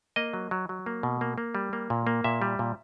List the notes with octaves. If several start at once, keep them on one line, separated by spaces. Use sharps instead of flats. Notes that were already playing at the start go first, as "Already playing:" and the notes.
A#3 D#5
F#3
F#3
F#3
A#3
B2
A#3
A#3
G3
A#3
A#2
A#3
A#2 E5
G3
A#2